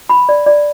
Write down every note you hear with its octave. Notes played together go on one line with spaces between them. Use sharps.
B5
D5
D5